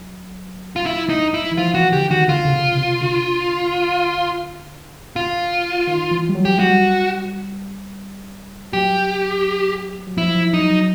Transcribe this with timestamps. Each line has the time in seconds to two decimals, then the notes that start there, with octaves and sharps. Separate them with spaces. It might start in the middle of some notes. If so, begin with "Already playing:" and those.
Already playing: F#3
0.76 F4
0.86 E4
1.09 D#4
1.34 E4
1.52 E3
1.57 F3 F4
1.75 E3 F#4
1.93 D3 G4
2.11 D#3 F#4
2.29 D3 F4
2.45 C#3
2.53 C3
2.72 C#3
2.77 C3
3.01 D3
5.16 F4
5.87 D#3
6.11 E3
6.29 G3
6.35 F#3
6.45 F#3 G4
6.59 G3 F#4
8.73 F#3 G4
10.07 F#3
10.17 F3 E4
10.35 F3
10.53 F#3 D#4
10.71 F#3